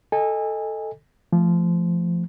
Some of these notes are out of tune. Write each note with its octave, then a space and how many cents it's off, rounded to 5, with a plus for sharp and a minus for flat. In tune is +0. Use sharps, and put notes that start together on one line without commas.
A4 +0 D#5 +0 G#5 -30
F3 -20 A3 +0